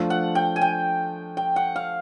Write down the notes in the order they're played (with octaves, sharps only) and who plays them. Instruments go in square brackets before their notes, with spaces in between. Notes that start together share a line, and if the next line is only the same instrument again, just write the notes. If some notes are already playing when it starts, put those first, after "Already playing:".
Already playing: [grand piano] F3 A3 D4 F4
[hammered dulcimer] F#5
G5
G#5
G5
G5
F#5
F5